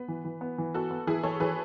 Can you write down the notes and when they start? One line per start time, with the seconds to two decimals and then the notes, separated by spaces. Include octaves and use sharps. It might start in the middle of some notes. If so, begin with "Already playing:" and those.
Already playing: B3 B4
0.08 E3
0.25 E3
0.41 B3
0.58 E3
0.74 B3 F#4 A4
0.91 B3
1.07 E3 E4 G#4
1.23 E3 A4 C#5
1.40 E3 G#4 B4